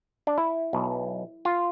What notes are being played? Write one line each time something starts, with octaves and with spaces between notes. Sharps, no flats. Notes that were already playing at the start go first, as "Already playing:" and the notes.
D4
E4
B1 B2
F4